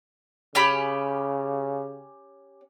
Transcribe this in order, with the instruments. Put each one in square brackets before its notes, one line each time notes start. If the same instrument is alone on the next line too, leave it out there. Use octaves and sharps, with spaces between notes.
[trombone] C#3 [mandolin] C#4 G4 B5